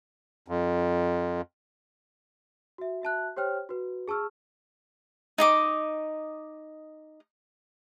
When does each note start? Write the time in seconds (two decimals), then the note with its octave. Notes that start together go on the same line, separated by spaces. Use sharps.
0.48 F2
2.78 F#4 E5
3.02 F#4 E5 A5 F#6
3.37 G4 C5 C#5 G5 F6
3.69 F#4 B4
4.08 G#4 A5 C#6 E6 F6
5.38 D#4 D#5 D6